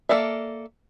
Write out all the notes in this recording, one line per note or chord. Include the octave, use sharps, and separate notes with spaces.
A#3 A4 D5 E5